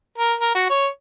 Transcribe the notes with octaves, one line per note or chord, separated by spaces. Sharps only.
A#4
A#4
F#4
C#5